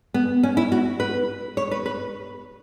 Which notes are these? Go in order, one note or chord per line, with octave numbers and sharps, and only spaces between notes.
B3
C#4
E4
F#4
B4
C#5
B4
B4